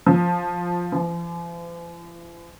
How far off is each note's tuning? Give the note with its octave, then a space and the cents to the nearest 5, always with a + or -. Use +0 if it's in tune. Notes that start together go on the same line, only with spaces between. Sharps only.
F3 +5
F3 -45